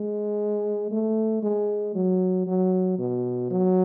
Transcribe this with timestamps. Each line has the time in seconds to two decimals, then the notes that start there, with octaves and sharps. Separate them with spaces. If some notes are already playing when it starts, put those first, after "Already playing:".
Already playing: G#3
0.91 A3
1.43 G#3
1.95 F#3
2.47 F#3
2.99 B2
3.51 F#3